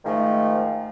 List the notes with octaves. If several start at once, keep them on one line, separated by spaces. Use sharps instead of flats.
G#2 D#3 F3 A3